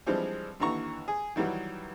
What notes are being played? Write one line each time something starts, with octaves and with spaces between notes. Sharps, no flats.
E3 F3 G3 G#3 C4 D4
D#2 D3 E3 A#5 C#6
G#4
D#3 E3 F#3 G3